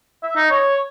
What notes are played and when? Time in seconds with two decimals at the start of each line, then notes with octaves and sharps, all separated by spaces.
0.23 E5
0.36 D#4
0.50 C#5